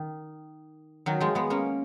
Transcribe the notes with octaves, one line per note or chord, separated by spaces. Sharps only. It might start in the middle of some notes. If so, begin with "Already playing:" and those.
Already playing: D#3
D#3 F#3
F3 G#3
G#3 B3
A#3 C#4